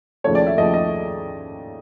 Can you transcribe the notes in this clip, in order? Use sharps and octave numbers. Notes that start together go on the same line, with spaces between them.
D#2 C#3 F3 A3 C#5
D5
E5
D#2 C#3 F3 A3 D#5
D#5